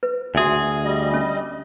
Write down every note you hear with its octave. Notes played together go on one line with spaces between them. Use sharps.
B4
D2 F#4 G#4 E5 G#5
G3 D#5
C#4